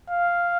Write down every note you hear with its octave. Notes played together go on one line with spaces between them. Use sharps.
F5